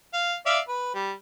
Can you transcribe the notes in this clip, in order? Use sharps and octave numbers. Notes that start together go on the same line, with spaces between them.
F5
D5 E5 F5
B4
G3